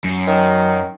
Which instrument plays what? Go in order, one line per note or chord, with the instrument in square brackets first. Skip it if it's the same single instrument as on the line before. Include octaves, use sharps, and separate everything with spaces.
[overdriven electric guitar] F#2
[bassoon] D#3 [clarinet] F#3